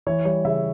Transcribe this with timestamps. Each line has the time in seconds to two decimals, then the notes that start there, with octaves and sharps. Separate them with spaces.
0.07 E3 C#5
0.25 G3 C#5
0.45 C#3 E5